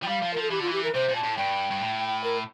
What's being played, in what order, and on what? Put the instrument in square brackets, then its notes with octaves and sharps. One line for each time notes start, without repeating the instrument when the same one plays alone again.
[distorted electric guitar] F3 [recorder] G5
[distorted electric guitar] G3 [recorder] F5
[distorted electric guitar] F3
[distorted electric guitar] F3 [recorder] A#4
[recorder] A4
[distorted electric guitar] E3 [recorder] G4
[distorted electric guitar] D3
[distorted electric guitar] E3 [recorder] F4
[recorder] G4
A#4
[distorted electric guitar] C3 [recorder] C5
[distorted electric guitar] A#2
[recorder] A5
[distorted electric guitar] A2
[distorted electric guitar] G2 [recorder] G5
[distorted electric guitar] G2
A2
[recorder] A#4